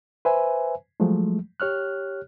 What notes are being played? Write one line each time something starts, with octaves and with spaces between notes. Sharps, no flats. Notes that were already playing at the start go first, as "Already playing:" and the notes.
B4 C5 E5 G#5
F3 F#3 G#3 A3
G4 C#5 F6 F#6